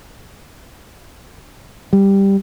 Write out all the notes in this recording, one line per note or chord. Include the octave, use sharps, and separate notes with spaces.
G3